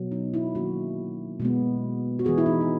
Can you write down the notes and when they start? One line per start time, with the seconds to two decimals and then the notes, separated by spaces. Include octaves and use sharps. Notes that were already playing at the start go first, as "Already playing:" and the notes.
Already playing: B2 F#3 B3
0.11 D#4
0.34 E4
0.55 D#3 F#3 A#3 C#4 F#4
1.40 B2 G#3 B3
2.19 F#4
2.25 E3 B3 G#4
2.38 E4
2.46 D#4
2.61 F#4